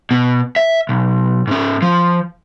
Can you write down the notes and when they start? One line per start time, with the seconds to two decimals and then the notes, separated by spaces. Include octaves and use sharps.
0.11 B2
0.56 E5
0.89 B1
1.47 G#2 C#4
1.82 F3